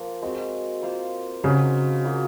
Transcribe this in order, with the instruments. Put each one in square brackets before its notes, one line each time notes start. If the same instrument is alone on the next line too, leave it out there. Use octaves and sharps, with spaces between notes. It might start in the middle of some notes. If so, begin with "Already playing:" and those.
Already playing: [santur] F3 A#3 F4 A#4
G#3 C4 F#4
A#3 F4 C5 F5
[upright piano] C#3 [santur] F#3 C4 D#4 G#4
[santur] F#3 A#3 F4 G#4